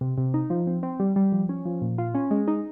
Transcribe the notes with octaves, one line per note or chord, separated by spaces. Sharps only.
C3
C3
D#4
F3
C4
C4
G3
G3
F3
C#4
F3
A#2
F4
C#4
G#3
D#4